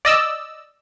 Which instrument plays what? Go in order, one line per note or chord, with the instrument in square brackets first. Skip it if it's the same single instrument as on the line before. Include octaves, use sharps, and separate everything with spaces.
[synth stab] D5 D#5 E6